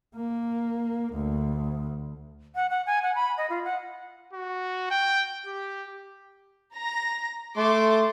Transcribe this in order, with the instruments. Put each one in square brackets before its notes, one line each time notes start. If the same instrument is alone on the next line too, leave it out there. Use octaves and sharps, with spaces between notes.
[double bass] A#3
D2
[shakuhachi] F#5
F#5
G#5
F#5
B5
D#5
F4
F#5
[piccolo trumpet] F#4
G5
G4
[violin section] A#5 A#6
[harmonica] A3 [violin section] A5 C6 D6